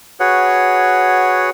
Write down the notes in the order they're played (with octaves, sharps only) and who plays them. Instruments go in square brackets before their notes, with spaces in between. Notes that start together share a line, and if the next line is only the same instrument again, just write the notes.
[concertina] F#4 G#4 B4 C#5 F#5